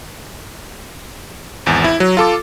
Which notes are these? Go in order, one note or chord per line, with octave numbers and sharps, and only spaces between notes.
G#1 E2
E4
F#3
F4 A4 D6